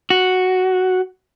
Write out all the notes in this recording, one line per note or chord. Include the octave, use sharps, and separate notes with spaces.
F#4